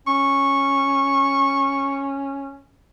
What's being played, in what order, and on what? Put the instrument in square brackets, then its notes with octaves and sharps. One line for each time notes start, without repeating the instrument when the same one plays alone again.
[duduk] C#4 [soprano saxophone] C#6